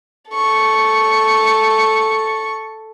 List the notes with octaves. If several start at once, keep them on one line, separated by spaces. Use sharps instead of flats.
A4 C#6